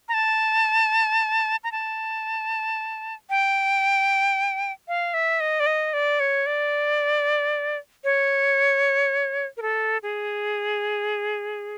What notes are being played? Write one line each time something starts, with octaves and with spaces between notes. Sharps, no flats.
A#5
A5
A#5
A5
G5
F5
E5
D#5
D5
D#5
D5
C#5
D5
C#5
A#4
A4
G#4